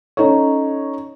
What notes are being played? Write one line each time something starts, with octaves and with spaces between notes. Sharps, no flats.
C#4 D#4 A4 C#5